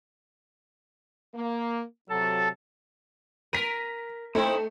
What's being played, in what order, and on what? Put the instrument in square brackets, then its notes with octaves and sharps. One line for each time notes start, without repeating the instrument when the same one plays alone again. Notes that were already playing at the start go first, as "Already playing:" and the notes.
[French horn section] A#3
[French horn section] C3 F#3 [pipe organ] A4 A5
[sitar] A#4 [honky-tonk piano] B6 D#7
[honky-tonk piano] A3 [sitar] C4 D#4 E4